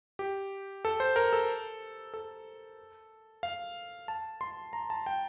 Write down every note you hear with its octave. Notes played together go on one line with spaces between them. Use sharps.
G4
A4
C5
A#4
A4
A4
F5
A5
C6
A#5
A5
G5